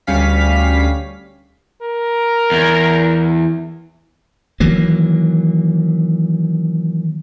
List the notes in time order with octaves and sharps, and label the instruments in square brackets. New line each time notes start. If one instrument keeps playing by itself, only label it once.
[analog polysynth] D2 G3 C#4 F5 B6
[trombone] A#4
[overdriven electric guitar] E2
[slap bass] D#3 E3 F#3 A#3